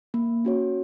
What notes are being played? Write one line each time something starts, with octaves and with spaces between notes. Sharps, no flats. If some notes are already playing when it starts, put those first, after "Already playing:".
A#3
C#4 F#4 C#5